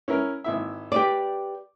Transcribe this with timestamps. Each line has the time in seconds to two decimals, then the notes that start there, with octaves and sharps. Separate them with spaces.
0.08 C#4 E4 A#4
0.44 G#1 E4 E5
0.92 G4 B4 D5 D6